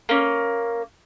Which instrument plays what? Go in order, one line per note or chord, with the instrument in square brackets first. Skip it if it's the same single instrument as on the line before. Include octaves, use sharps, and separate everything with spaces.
[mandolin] A#3 C#4